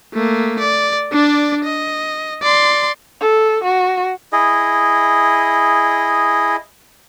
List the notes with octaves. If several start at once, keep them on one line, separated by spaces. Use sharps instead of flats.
A3 A#3
D5
D4 D5
D#5
D5 C6
A4
F#4
E4 G#4 D#5